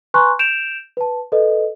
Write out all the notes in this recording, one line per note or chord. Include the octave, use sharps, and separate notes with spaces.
B4 G#5 A#5 C6 C#6 F#6
G6 D7 E7 F7
B4 A5
A4 B4 D#5